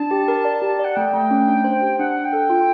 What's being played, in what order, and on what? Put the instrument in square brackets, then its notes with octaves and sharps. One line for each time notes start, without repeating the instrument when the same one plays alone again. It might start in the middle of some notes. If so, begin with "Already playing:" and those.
Already playing: [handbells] D4 [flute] A5
[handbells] G4
A#4
D5
G4
D5
[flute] F#5
[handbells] A3 [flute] G5
[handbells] A3
C#4
D4
C5
G4
[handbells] D4 [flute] F#5
[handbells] D4
[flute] G5
[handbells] A4
F4